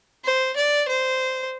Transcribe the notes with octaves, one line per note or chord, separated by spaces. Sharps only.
C5
D5
C5